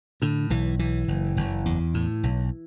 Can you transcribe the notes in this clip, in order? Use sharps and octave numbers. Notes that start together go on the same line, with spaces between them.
A2 D3
B1 E3
B1 E3
F#1
F#1
E2
A2
B1